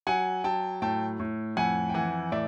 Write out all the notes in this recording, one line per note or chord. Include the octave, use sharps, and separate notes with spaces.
F#3 F#5 G#5
F#3 G5 A5
A2 G5 A5
A2
F2 F#5 G#5
G5
E3 F#5 G#5
A2 D5 E5